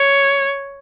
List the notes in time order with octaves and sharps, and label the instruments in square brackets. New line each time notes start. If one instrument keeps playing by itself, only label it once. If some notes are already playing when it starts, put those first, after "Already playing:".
Already playing: [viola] C#5